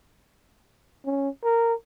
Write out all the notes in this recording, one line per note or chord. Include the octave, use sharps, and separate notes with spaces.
C#4
A#4